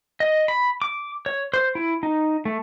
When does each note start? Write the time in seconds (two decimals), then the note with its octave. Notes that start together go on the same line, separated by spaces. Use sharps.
0.20 D#5
0.48 B5
0.82 D6
1.26 C#5
1.54 C5
1.75 E4
2.03 D#4
2.45 A3